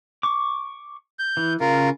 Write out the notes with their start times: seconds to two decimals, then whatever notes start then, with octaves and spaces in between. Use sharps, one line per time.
0.23 C#6 D6
1.19 G6
1.37 E3
1.60 C#3 F4 A#4